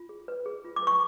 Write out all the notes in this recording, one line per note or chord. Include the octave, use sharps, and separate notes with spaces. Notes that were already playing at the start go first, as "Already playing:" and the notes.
Already playing: F4
G#4
B4
G#4
F4
D6
B4 C#6